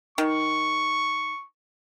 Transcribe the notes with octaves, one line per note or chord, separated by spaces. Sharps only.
D#3 C#6